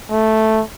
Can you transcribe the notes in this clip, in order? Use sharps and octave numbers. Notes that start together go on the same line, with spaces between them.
A3